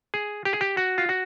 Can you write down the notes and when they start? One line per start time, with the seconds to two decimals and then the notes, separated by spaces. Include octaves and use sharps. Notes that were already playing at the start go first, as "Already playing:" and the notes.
0.14 G#4
0.45 G4
0.53 G#4
0.61 G4
0.77 F#4
0.98 F4
1.09 F#4